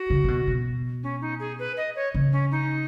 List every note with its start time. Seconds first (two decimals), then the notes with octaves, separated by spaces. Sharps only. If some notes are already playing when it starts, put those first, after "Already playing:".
Already playing: F#4
0.10 C#3
0.24 C#3
0.28 B2
0.47 B2
1.03 C#4
1.21 D#4
1.40 G#4
1.59 B4
1.77 D#5
1.96 C#5
2.15 C#3
2.32 C#4
2.51 D#4